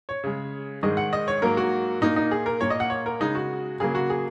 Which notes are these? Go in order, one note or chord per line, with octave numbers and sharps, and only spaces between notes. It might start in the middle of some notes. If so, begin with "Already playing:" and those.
C#5
C#3 G#3
G#2 D#3 G#3 D#5
F#5
D#5
C#5
G#2 F#3 A#3 A#4
F#4
A#2 A#3 D#4
D#4
G#4
A#4
A#2 A#3 C#5
D#5
F#5
C#5
A#4
C#3 G#3 D#4
F#4
C#3 F#3 A#3 G#4
F#4
G#4